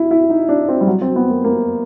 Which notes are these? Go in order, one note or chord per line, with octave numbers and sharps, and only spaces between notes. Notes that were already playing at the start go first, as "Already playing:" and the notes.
Already playing: E4
E4
D#4
D4
C4
G3
F#3
C4
B3
A#3
A#3